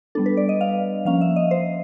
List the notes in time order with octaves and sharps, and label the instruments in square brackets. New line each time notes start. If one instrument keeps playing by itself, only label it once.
[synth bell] G3 B3 D4 A4
B4
D5
D#5
F5
F3 A#3 C#4 F5
E5
D#5
C5